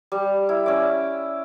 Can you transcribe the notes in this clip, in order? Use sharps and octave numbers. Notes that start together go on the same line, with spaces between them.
G3
E4
C#4 D5